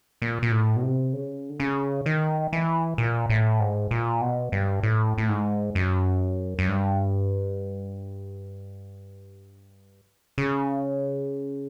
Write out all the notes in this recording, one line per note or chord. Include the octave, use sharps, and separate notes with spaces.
A#2
A#2
A2
B2
C3
C#3
D3
C#3
D#3
E3
A#2
A2
G#2
A#2
B2
G2
A2
A2
G#2
F#2
F#2
G2
C#3